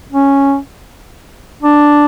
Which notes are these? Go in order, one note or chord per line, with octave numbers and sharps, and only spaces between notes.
C#4
D4